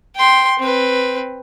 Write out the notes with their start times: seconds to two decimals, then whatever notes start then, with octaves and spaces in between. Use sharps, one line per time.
0.16 G5 C6
0.59 C4 B4